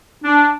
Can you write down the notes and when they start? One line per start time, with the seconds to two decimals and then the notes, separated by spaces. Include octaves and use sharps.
0.24 D4